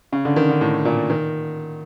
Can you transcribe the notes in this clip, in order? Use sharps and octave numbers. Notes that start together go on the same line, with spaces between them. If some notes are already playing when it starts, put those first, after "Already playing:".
C#3
D3
D#3
D3
A2
A#2
D#3